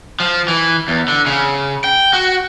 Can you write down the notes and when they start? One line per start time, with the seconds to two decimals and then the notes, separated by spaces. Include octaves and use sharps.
0.20 F3
0.48 E3
0.88 E2
1.08 D3
1.26 C#3
1.84 G5
2.13 F#4